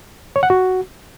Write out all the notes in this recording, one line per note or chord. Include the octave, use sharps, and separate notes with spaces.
C#5
F#5
F#4